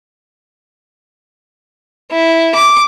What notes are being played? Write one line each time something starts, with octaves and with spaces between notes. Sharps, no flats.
E4
D6